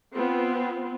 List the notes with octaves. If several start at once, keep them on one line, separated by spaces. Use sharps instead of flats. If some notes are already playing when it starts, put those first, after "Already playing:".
B3 C4 F4